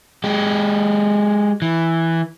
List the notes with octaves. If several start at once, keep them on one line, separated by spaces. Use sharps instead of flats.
G#3 G4
E3